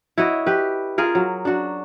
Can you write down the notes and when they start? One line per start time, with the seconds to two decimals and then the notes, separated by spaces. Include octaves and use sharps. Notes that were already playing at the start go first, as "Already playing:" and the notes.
0.18 E4 F#4 C#5 D#5
0.46 G4 B4
0.98 F4 G#4 A#4
1.15 F#3
1.45 D4 F#4